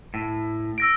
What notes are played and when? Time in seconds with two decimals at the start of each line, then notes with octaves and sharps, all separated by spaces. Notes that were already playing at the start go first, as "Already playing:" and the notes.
0.14 A2
0.78 E6 A#6 D7